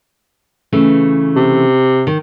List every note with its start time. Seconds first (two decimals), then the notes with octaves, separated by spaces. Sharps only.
0.73 C#3 E3 A3
1.36 C3
2.07 D#3